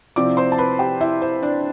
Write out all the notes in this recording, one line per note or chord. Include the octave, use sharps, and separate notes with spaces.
C3 F3 C4 E4 D5 D6
C5 C6
A5
B4 B5
G4 G5
E4 E5
C5
D4 D5